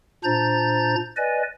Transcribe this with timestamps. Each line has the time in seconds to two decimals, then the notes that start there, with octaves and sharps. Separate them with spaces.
0.24 A#2 D4 C5 A#5 G6 A6
1.16 B4 D5 D#5 G#5